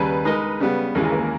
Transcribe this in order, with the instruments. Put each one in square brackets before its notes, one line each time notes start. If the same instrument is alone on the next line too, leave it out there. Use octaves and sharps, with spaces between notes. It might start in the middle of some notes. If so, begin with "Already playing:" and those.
Already playing: [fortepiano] D#2 C#3 G3 [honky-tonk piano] B4
[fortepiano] G#3 D#4 A#4 D#5 [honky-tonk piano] B4
[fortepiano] C#3 G3 B3
[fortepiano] D#2 C#3 E3 G#3 [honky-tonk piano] A#4
[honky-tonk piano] G#4
A#3